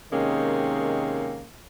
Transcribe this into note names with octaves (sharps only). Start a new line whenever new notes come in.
C3 D#3 G#3 A#3 C#4